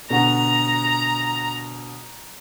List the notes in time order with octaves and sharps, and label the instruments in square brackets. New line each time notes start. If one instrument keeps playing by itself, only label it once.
[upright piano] B2 D3 F#4 [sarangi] A#5